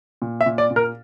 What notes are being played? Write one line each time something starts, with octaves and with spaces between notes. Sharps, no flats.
A#2
E5
A#2
D5
A#2
A#4